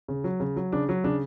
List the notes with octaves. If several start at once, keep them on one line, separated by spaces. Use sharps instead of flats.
C#3
F#3
C#3
F#3
C#3 D4
F#3
C#3 D4